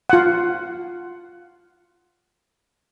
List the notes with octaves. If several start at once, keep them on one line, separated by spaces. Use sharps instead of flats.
F4 F#5